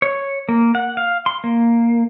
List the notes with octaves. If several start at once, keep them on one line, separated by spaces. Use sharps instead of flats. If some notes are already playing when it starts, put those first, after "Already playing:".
C#5
A#3
F#5
F5
C6
A#3